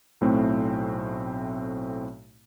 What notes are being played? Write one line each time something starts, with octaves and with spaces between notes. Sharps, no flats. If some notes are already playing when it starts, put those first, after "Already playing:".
B1 A2 A3 C4